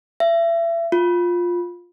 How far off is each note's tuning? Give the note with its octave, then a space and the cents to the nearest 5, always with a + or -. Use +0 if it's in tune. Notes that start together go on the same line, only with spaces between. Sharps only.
E5 +30
F4 +10